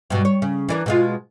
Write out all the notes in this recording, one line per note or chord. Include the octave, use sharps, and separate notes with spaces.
G2 B2
C#5
C#3
E3 D4 A#4
B2 G#3 F4